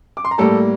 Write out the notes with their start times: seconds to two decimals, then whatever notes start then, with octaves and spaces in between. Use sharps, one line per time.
0.17 D6
0.25 C6
0.31 A#5
0.38 A2 G3 A#3 A4 A5